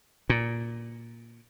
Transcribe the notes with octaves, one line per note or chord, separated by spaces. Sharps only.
A#2